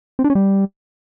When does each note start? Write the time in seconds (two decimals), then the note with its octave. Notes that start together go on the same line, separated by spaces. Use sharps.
0.19 C4
0.24 D4
0.30 C#4
0.35 G3